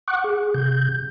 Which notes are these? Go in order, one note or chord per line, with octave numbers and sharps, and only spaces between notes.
F#5 C#6 D6 F#6
G#4
C3 G6